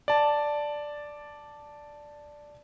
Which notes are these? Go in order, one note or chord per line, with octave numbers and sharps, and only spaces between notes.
D5 A5